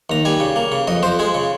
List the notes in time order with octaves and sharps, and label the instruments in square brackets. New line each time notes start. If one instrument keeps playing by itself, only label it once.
[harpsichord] D#2 A#5
G3 G#5
C#3
A#3
C#3
F2 D#5
F2 C5
G#3 G#4
C#3